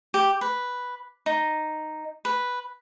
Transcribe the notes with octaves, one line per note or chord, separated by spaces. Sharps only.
G4
B4
D#4
B4